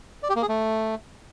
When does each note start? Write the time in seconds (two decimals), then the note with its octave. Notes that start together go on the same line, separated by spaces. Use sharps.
0.23 D5
0.29 G4
0.36 A#3
0.42 G#4
0.49 A3